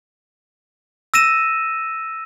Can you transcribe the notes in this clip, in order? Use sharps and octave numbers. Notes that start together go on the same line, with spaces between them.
E6 A#6 D#7 E7